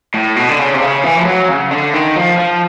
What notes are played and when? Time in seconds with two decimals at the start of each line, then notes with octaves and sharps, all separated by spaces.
0.14 A2
0.36 B2
0.49 D3
0.59 C#3
0.74 C3
0.81 C#3
1.04 E3
1.18 F3
1.26 F#3
1.49 C#3
1.71 D3
1.94 D#3
2.16 F3
2.37 F3